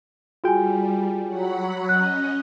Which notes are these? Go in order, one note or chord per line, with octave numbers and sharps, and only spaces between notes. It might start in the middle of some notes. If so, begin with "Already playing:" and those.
G3 F4 F#4 G#4 G5 G#5
F#3 F#5 B5
C#4 D#5 F#6